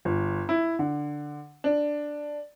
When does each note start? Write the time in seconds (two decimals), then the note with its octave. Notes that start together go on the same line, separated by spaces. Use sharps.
0.05 G1
0.49 E4
0.79 D3
1.64 D4